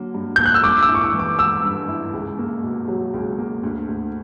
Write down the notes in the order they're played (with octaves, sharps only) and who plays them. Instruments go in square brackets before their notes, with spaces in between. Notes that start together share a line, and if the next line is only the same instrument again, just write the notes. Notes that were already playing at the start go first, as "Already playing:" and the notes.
Already playing: [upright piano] D3 F#3 A#3
G2
[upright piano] A#3 [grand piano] G6
[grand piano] F#6
E6
[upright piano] G2 [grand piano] D6
[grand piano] E6
[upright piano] E4
[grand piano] C#6
D6
[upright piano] E3
[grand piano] D6
[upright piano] B3 [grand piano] E6
[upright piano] G2
E4
C#2
A#3
B2
F#3
C#2
A#3
D2
D2